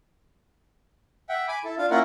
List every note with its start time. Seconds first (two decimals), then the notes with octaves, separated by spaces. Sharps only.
1.29 E5 F#5 G5
1.48 G#5 B5 D6
1.64 E4 A4
1.78 D4 F4 F5
1.91 A#3 C#4 E4 F4 A#4 F#5